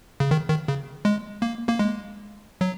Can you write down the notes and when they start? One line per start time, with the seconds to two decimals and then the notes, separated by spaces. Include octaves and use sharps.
0.20 C#3
0.31 D#3
0.49 D#3
0.68 C#3
1.05 G#3
1.42 A#3
1.69 A#3
1.79 G#3
2.61 F#3